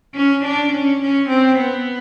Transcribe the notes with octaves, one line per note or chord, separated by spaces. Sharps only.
C#4
D4
C#4
C#4
C4
B3